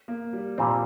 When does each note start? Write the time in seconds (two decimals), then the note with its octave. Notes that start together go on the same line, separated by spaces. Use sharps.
0.08 A#3
0.33 G3
0.58 A#2 F3 G3 C4